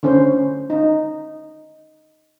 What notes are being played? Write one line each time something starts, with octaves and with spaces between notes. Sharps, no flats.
D3 C#4 C5
D#4